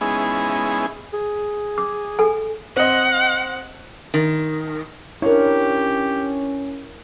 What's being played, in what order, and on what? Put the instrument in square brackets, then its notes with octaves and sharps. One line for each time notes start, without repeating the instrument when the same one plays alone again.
[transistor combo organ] G#3 B3 C#4 D#4 E4 G#4
[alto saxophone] G#4
[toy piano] D6
A4 G#5
[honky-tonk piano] C4 D#5 [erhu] F#5
[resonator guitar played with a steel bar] D#3
[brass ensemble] C#4 [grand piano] D4 C#5 [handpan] E4 A#4 [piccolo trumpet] G4